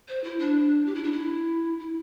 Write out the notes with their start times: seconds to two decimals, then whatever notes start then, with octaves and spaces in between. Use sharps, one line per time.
0.08 C5
0.24 E4
0.39 D4
0.86 G4
0.95 E4
1.03 D4
1.12 E4
1.79 E4